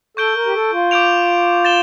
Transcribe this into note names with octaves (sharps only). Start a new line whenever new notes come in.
A4 C#6 G6 D7 G7
A#4
G4
A4
F4
D6 G6 D7 F7
A6 E7 G7